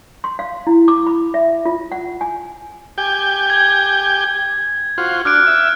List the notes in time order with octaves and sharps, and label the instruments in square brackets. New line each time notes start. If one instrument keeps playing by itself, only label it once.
[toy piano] C6
F5
E4
D6
B5
E5
F4
F#5
G#5
[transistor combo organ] G4 G5 G#5
[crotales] G#6
[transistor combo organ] F4 F#4 C5
[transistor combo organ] D4 [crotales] F6 F#6 D7
[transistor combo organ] E5